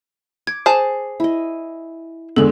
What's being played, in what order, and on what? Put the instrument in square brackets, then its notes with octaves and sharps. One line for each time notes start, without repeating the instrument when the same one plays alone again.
[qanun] D6 [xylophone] G#6
[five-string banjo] G#4 A5 [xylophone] C5 E7
[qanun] E4 D#5
[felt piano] E2 D3 G#3 [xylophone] A4 F#7